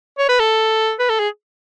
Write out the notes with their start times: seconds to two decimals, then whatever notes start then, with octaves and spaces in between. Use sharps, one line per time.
0.19 C#5
0.29 B4
0.40 A4
0.99 B4
1.10 A4
1.19 G#4